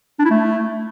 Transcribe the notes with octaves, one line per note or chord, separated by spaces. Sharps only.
D4
E4
A3